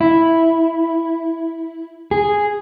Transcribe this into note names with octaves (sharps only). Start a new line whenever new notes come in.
E4
G#4